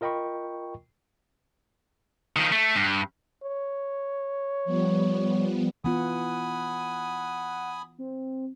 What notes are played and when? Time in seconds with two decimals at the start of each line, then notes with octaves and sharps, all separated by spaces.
0.01 F4 A#4 D#5 G5 B5 C#6
2.36 D#3 F3
2.52 A3
2.76 G2
3.43 C#5
4.65 F3 G3 B3
5.84 E3 B3 F4 F#5 G#5 B5 D#6
7.99 C4